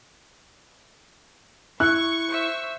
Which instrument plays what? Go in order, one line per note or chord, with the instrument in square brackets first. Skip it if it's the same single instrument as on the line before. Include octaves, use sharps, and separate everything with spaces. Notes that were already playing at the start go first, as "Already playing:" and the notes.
[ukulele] E4 [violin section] C#6 [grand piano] F#6
[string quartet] C5 E5 E6